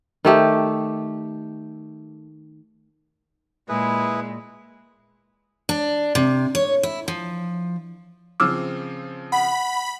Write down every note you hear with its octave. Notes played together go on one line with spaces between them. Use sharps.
D#3 A3 G4
A#2 G#3 E4 G#4 B4
D4
C3
C#5
E4
F3
C#3 F3 C4 D6 E6 F6
F#5 B5